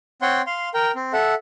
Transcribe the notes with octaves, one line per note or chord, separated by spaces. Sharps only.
C4 C#5 F#5 G5 C6
F5 C6
A#4 G5
C4
A4 E5 F#5